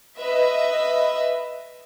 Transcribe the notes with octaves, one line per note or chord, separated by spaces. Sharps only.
B4 D#5 E5